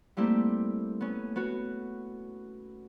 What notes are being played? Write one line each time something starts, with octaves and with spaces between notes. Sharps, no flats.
G3 A3 A#3 C4 E4 G4
B3 C#4
B3 F#4